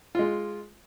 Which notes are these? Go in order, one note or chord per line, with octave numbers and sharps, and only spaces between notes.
G#3 F4